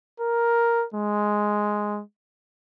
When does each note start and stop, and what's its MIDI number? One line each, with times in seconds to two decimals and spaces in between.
0.20 0.86 70
0.95 2.02 56